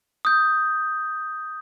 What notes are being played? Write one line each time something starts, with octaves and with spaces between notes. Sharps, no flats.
D#6 G6